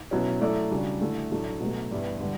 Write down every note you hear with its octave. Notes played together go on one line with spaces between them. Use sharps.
B2 F#3 C#4 E4
F#3 A3 E4 A4 D5
C#3 G3 D4 F#4
D3 A3 E4
A2 F#3 A3 D4
B2 F#3 A3
G2 E3 G3 B3 E4
D3 G3